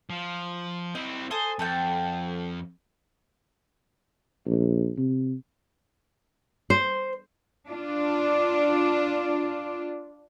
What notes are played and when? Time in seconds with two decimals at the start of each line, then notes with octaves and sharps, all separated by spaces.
0.10 F3
0.95 C4 E4 D#5
1.31 A4 C5 G#5 D#6
1.59 F2 A4 F#5 G5
4.45 A#1
4.97 C3
6.70 C5
7.67 D4 F4